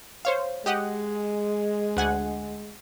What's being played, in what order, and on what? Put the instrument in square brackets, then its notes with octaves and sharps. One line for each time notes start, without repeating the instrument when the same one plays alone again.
[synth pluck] C5 C#5 F5
[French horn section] G#3 [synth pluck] G4 D#5 F#5
[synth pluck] D2 F#5 G#5